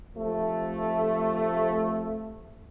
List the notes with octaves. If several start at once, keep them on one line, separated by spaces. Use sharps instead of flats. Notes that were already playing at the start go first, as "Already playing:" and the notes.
C3 F3 A3